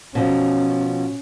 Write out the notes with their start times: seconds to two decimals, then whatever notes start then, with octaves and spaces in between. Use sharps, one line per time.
0.15 B2 F3 C#4